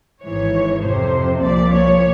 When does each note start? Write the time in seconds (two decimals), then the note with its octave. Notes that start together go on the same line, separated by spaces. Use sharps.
0.23 G#1 G#2 E3 C#5
0.82 F2 C3 F3 C5
1.42 C2 A#2 F3 D5
1.73 C#5